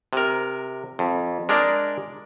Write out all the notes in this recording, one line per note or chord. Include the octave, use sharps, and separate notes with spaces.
C3 A#4
F2
G#3 D4 A#4 D5